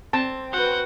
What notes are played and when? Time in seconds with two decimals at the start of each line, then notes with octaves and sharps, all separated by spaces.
0.13 C4 A5
0.53 F#4 B4 F#5 G6